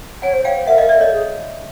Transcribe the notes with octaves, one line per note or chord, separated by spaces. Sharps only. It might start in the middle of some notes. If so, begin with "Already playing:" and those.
C#5 F#5 G#5
C5
C#5 F5 G5
C5
A#4 E5 F#5
A#4 D#5 F5
D5 E5
A4 C#5 D#5
G#4